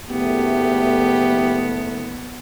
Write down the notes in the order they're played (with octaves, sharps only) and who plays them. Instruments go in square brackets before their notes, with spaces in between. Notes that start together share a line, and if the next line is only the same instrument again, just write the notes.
[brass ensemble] F#1 A3 [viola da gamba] B3 [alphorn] G4